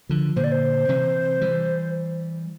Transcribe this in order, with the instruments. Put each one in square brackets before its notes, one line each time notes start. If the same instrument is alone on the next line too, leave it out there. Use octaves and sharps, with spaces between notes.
[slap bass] D3 F3
[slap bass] A#2 D3 [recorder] C5
[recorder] D5
C5
[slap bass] C3 E3
E3 G3